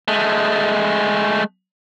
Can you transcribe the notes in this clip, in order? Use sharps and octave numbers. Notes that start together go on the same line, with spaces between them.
G#3 A3